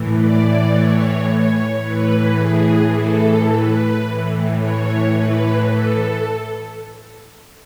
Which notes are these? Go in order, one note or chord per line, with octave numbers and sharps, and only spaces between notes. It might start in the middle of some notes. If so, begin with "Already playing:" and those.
Already playing: A2 E3
D5
C#5
C#5
A2 E3 B4
G#4
A4
B4
A2 E3
C#5
B4
A4